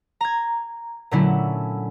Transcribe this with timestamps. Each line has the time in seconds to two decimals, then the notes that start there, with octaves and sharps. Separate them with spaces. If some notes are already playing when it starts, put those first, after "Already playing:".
0.21 A#5 G#6
1.11 A#2 D3 F#3 A3 C#4 E4